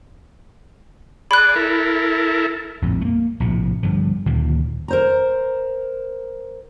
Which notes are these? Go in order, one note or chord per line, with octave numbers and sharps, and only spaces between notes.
G#4 D5 B5 F#6
E4 A4 A#4
A#1 F2 A2
A3 A#3
A#1 A2 C3
G2 D3 F3
D2 A#2 D#3 A#3
A#4 C5 A#5